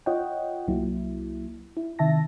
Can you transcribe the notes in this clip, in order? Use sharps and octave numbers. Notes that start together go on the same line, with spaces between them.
F4 C#5 D#5 F#5 G5
C2 F#3 A#3 E4
E4
C3 D#3 E5 A5 A#6